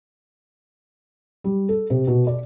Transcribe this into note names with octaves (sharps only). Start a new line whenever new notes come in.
G3
A4
C3
B2
D5